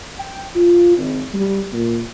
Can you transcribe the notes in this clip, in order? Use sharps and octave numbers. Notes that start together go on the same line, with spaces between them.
G5
F4
G#1
G3
A#2